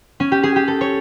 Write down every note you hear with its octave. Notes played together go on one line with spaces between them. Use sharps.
C#4
G4
G#4
G4
A4
C#5